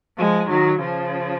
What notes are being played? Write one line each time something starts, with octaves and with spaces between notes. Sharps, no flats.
F3 G#3
D#3 F#3
C#3 F3